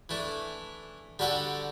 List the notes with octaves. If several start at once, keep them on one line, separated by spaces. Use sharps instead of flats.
E3 A3 D4
D3 G3 D4 F#4 A4